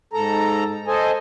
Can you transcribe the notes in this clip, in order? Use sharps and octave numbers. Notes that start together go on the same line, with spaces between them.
G#2 A4 A#5
A4 C5 D#5 G#5